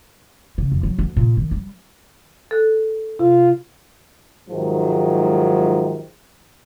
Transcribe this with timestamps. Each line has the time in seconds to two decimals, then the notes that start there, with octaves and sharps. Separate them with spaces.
0.58 C#3
0.72 F2
0.83 F#3
0.99 D2
1.17 A#2
1.37 D#3
1.51 G3
2.51 A4 F#6
3.19 C3 F4
4.48 G#2 C3 D#3 F3 F#3 G#3